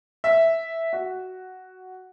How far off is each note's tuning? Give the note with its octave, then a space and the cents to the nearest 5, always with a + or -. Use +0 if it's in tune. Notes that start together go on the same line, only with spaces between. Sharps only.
E5 -5
F#4 +5